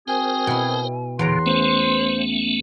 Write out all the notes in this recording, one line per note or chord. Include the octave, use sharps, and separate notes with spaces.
C4 F#4 G#4 A#4 C5 G#5
B2 E4
E2 A#2 D3 B4 C#5 A#5 C6
A3 B3 C#4 C5